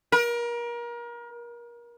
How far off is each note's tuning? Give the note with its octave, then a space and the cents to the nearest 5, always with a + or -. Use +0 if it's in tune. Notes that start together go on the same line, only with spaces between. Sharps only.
A#4 +30